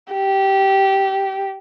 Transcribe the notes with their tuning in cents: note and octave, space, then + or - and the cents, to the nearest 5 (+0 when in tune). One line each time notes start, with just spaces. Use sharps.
G4 -15